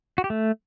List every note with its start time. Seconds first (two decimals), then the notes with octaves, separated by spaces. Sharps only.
0.18 F#4
0.24 G4
0.30 A3